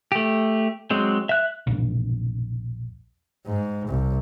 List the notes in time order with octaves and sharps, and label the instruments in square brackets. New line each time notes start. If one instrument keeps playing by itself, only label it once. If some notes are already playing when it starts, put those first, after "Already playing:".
[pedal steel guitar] A3 G4
F#3 G#3 C4
E5 F#6
[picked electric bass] E1 A#1
[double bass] G#2
C2